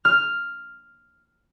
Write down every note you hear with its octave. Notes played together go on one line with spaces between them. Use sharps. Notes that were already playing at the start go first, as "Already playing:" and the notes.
F6